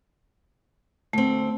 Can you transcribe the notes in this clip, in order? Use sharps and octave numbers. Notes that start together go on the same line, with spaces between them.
D2 A3 C4